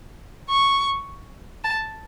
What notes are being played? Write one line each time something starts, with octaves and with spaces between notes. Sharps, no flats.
C#6
A5